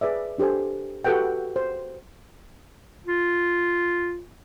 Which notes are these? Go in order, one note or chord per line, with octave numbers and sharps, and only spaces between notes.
G#4 B4 D5 E5
D4 G4 A4 C5 G#5
A4
F#4 G4 A4 B4 F#5 G5
C5
F4